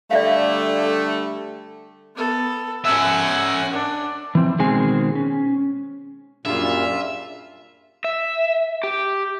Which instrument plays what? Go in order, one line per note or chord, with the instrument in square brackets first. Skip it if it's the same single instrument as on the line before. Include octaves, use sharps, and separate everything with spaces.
[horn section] D3 G3 A3 [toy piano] D5 E5 F5
[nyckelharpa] B3 A4
[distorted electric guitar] C#4 E5 [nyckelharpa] F#5 G#5
[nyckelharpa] D4
[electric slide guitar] E3 C4
B2 D#3 G#3 C4 G#4 G#5
C#4
[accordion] F#2 A#2 G3 [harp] D4 G#4 [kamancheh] F4 [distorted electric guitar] E5
[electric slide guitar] E5
G4